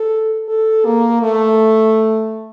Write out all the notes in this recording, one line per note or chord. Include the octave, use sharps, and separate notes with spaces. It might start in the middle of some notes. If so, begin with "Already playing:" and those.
Already playing: A4
A4
A#3
A3